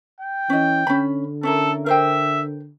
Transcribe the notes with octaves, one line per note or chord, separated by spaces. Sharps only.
G5
E3 C#4 D#5
D3 C#4 B5
C#4 E4 A4 A#4
A#4 C5 E5 G5